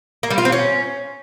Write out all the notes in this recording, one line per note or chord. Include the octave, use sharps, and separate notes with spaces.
A#3
G3
F4
C4
C#4